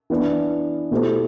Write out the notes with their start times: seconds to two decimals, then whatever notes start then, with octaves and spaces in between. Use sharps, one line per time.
0.10 E3 B3 D4
0.91 B2 A3 E4 G4 C5